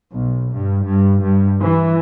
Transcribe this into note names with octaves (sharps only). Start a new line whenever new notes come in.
B1
G2
G2
G2
E3